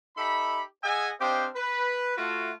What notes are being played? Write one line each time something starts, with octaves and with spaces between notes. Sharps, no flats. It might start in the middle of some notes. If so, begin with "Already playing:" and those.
D#4 G4 A4 E5 B5
G#4 D#5 E5 F#5 G#5
C4 D4 G4 C5 D#5 F5
B4
A3 F4 F#4